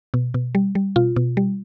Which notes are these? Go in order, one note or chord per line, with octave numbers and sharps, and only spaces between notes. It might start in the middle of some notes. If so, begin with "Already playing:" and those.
B2
B2
G3
G3
B2 F4
B2
G3